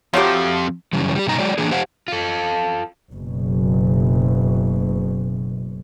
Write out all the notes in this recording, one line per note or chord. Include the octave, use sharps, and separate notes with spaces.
F2 F3 F#3 A3 F4 G4 C5
F#2 C#3 E3 G3
G3 G4
G2 B2 D#4 A#5
F#3 G#3 D5
E3 A#3 D4 G#4
G4 C5 F5 F#5
F4 A4
F#1 B2